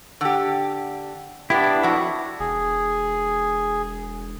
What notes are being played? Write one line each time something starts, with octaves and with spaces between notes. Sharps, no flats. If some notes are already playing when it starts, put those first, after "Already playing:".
D3 G4
B3 D4 E4 G4
F2 F#4
E1 G#4